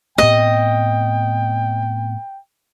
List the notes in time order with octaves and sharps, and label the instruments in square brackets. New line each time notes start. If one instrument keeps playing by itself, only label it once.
[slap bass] A2 B3 C4 [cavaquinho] D#5 [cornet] G5